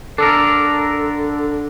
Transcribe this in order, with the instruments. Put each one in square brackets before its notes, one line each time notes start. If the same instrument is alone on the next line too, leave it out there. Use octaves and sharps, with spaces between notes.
[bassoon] D3 [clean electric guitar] D4 A4 A#4